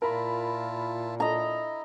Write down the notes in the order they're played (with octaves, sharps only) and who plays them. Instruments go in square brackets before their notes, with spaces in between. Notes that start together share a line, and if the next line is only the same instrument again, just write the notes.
[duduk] A#2 [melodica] E4 F4 A5 [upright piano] A#4 B5
[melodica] E4 [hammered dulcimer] D#5 A#5